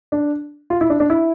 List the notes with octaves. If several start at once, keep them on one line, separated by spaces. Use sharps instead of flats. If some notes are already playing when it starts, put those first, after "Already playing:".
D4
F4
E4
D4
D4
E4